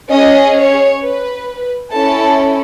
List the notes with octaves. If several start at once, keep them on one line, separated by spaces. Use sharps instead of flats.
C#4 G#4 D#5
C#5
B4
C#4 E4 A4 A5